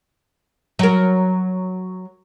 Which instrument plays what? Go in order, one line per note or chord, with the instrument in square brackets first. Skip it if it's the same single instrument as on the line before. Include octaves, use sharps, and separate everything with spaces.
[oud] F#3 A#4